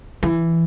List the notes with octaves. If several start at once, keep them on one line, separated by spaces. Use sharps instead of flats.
E3